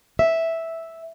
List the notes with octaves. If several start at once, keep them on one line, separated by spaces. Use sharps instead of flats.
E5